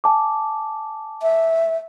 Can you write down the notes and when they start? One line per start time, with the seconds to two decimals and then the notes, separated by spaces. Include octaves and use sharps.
0.04 G#5 A5 D6
1.22 E5